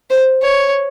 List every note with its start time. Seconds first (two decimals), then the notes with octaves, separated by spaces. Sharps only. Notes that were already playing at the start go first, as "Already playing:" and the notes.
0.10 C5
0.42 C#5